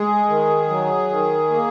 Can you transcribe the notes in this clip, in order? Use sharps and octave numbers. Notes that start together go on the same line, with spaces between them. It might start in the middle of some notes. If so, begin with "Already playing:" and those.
Already playing: G#3 G#4
D#3
F#3
D#3
A#3